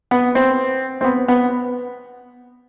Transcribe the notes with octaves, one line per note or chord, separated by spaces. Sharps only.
B3
C4
C4
B3
B3